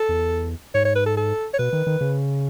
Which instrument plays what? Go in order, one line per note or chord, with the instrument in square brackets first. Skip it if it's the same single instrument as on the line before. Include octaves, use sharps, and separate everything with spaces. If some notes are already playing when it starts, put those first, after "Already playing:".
Already playing: [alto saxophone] A4
[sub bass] E2
[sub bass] G#2 [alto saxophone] C#5
[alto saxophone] C#5
B4
A4
A4
C#5
[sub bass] B2 [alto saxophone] B4
[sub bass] D#3
D#3
C#3